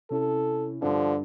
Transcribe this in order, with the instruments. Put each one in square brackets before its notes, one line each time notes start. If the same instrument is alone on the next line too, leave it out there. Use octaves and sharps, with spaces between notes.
[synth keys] C3 C#4 E4 [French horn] A4
[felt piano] G2 [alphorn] D3 [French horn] F3